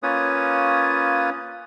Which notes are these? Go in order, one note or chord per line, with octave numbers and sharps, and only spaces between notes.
A#3 C#4 F4 B4 C#5 D#6